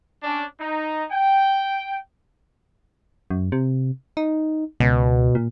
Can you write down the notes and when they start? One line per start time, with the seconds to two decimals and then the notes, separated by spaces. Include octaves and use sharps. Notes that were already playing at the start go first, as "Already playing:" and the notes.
0.23 C#4 D4
0.58 D#4
1.11 G5
3.30 F#2
3.52 C3
4.17 D#4
4.80 C#2 B2
5.35 A#2